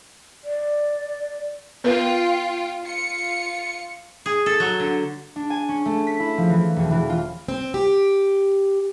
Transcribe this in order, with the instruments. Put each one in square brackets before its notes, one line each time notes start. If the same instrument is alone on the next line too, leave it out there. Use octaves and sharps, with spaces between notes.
[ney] D5
[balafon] B3 A#4 B4 [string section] F4 G5
[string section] F4 C#7
[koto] G#4
A4
F#3
D3
[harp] D4
G#5
C#4
A3
B6
E4
F3
E3
E1
E3
F4
[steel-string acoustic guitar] C4
G4